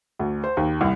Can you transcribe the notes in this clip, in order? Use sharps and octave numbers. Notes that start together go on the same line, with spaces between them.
D2
C5
D#2
C2